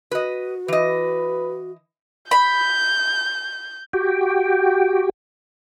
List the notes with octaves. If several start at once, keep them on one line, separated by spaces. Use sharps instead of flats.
F#4 B4 D#5
E3 B4 D#5
B5 G6
F#4 G4 G5